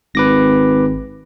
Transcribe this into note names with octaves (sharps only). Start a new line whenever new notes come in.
G#1 B4 D6 A#6